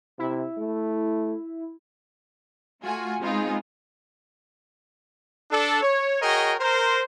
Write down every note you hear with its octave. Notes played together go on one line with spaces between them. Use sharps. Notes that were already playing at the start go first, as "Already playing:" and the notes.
C3 E4
A3
A3 F4 F#4 G#5
G#3 B3 C4 D#4 F4 G#4
D4 A4
C#5
F#4 G#4 A#4 C#5 D#5 G5
A#4 C5